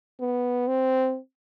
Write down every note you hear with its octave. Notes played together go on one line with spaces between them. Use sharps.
B3
C4